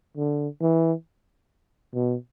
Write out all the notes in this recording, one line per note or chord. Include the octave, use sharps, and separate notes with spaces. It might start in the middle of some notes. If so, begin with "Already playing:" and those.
D3
E3
B2